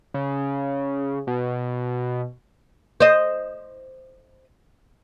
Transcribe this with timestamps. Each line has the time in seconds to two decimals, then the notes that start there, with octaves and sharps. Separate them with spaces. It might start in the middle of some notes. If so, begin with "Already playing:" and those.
0.14 C#3
1.27 B2
3.00 C5 D#5